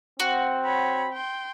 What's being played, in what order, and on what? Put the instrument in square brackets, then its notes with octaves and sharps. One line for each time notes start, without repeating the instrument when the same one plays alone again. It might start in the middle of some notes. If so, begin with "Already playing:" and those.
[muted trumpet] C4 [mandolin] F#4
[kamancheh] C#5 B5
G5 C6